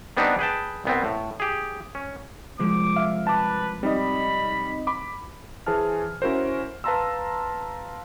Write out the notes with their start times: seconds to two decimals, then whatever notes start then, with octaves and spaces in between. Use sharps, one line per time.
0.17 G3 B3 C4 D4 D#4
0.39 G#4 B4 G5 A5
0.85 C2 B3 C4
1.04 A2
1.40 G4 G#4
1.95 C#4
2.59 C2 F3 G#3 D6
2.96 E5 F5
3.27 B4 A5 D6
3.83 G3 C4 D#4 D#5 B5
4.87 B5 D6
5.66 E3 G#4 C5 G#5 A5 F6
6.22 C#4 E4 F#4 A#4 C5
6.84 B4 F5 A5 A#5 C6 E6